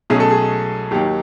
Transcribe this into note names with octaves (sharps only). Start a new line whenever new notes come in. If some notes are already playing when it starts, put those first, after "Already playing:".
B1 B2 F#3 A3 C#4 G#4
A4
G#4
D#2 D#3 F#3 G4